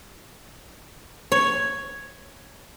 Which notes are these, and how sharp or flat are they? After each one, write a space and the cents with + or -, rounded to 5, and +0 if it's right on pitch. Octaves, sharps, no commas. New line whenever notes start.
C#5 +0